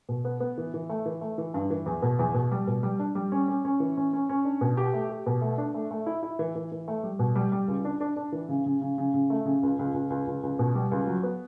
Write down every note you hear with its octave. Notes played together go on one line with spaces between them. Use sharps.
B2
B3
B3
E3
E3
A3
E3
A3
E3
G2
E3
E2
B2
E2
B2
G3
B2
G3
D4
G3
C#4
C#4
C#4
E3
C#4
C#4
C#4
D4
B2
G4
A3
G4
B2
A3
D4
A3
A3
E4
E4
E3
E3
E3
A3
G3
B2
G3
G3
C#2
D4
D4
D4
E3
C#3
C#3
C#3
C#3
C#3
A3
C#3
C#2
C#2
C#2
C#2
C#2
C#2
B2
G3
C#2
F#3
B3